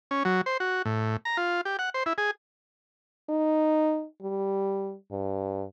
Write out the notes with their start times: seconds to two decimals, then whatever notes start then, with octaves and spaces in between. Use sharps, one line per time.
0.11 C#4
0.25 F#3
0.46 C5
0.60 F#4
0.85 A2
1.25 A#5
1.37 F4
1.65 G4
1.79 F#5
1.94 C5
2.06 E4
2.18 G#4
3.29 D#4
4.22 G3
5.11 G2